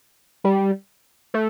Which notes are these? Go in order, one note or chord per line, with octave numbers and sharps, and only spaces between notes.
G3
A3